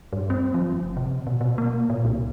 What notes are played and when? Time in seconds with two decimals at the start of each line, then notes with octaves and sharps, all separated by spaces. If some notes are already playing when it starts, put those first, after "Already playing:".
0.13 G2
0.30 C4
0.54 F3
0.72 F#1
0.97 C3
1.27 B2
1.41 B2
1.58 A#3
1.90 A#2
2.05 C2